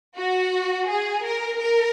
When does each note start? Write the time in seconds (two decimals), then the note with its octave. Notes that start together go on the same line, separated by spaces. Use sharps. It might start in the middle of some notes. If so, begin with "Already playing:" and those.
0.17 F#4
0.89 G#4
1.25 A#4
1.62 A#4